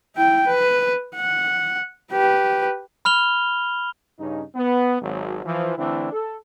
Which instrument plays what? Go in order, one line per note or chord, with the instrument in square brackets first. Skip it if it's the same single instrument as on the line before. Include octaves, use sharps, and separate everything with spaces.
[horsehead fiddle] E4 G5
B4
F#5
G4 B4
[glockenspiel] B5 F6 F7 G7
[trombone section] G2 C#3 C#4 D#4
B3
G#1 F#3
E3 F3
D3 E3 A3 C4 D4 E4
A4